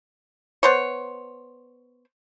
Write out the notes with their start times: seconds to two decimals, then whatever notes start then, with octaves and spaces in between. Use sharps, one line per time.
0.63 B3 C5 C#5